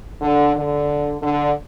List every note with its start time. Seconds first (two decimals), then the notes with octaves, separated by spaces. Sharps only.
0.22 D3
0.56 D3
1.22 D3